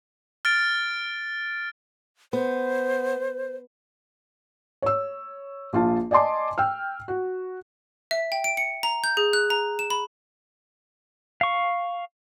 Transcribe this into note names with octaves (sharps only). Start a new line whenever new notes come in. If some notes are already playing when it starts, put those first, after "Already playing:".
F6 A6 D7
B3 C5
C#5 E6
A#1 F4 A5
D5 D#5 G#5 A5 C6 D6
G5 E6 F6
F#4
E5
G5
D7
C#7
A#5
G6
G#4
F#6
A#5
E7
B5
F5 C#6